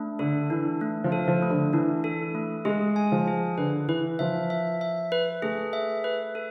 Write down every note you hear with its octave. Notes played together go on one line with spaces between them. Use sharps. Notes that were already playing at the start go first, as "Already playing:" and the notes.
Already playing: A3 D4
D3 A4
E3 D4
A3
F3
A4
F3
A3
D3
E3 D4
A4
A3
G#3 G#4
G#5
F3
G#4
D3 B4
E3 B4
F3 E5
E5
E5
B4
A3 G#4
E5
B4
A4